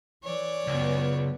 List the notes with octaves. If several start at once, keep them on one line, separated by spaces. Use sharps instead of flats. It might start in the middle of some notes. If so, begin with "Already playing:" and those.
E3 C#5 D5
C#2 F#2 B3